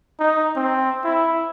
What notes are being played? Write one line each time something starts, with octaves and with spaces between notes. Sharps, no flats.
D#4
C4
E4